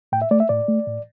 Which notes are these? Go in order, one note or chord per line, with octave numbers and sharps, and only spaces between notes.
A2 G5
E5
A3 D5
E5
A2 D5
A3
A2